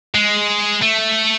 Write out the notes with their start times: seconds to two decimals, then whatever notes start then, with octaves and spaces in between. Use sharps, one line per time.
0.15 G#3
0.82 A3